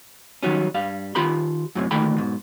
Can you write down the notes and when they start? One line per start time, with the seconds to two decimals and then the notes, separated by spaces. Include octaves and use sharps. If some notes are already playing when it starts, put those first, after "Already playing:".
0.43 D#3 F#3 G3 C#4
0.74 G2 G3 F5
1.15 D#3 F4 G4 B5 C6
1.75 F#2 A2 C3
1.91 D2 A#2 D#3 A3 G5 B5
2.18 G#2 B2